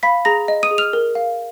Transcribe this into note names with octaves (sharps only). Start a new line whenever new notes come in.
F5 B5 B6
G#4 A#5 A#6
D#5
D#6 D#7
G#4
F6 F7
A#4
F5